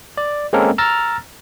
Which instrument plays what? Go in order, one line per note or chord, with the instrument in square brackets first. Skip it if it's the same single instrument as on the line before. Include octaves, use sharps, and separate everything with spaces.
[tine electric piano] D5
G#3 A#3 C4 C#4 A4 A#4
A#5 E6 F6 A6 A#6